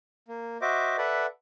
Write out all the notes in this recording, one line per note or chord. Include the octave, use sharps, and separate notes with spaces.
A#3
F#4 C5 D#5 E5 D6
A4 B4 D5 E5 F#5